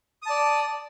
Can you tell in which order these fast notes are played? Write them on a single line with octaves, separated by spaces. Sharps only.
D#6 A5 D5